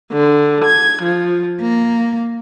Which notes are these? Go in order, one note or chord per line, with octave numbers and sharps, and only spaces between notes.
D3
G#6
F3
A#3